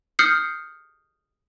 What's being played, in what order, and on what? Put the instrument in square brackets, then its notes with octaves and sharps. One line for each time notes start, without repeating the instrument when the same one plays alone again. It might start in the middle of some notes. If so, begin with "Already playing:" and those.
[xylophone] D#6 F6 G6 C7 C#7